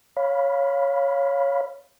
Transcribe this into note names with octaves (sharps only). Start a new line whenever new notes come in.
C#5 F5 B5